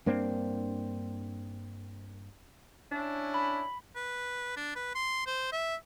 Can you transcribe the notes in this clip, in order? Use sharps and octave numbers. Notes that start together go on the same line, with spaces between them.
G2 A#3 C4 D4
C#4 D4 E4
B5
B4
D4
B4
C6
C5
E5